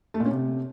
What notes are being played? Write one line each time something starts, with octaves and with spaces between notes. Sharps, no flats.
A3
A#2
C#4
C3